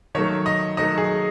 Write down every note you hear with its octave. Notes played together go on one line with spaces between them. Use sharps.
D#3 F#3 A3 C#5
D#5
D#3 F#3 A3 D#5
G#4